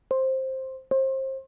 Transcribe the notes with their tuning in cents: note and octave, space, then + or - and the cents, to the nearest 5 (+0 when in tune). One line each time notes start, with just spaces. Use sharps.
C5 +10
C5 +30